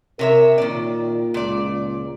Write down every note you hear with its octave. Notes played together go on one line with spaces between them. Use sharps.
C3 A#4 C#5 E5
A#2 D#3 D5
C#2 A#2 D5